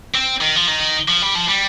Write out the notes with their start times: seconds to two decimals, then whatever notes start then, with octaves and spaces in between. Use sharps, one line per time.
0.14 C4
0.41 D#3
0.56 F3
0.68 D#3
1.08 F3
1.22 G3
1.35 F3
1.49 G3